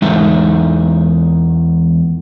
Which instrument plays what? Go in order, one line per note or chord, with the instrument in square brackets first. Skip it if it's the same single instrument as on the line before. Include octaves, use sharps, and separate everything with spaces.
[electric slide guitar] E2 G#3 D#4 E5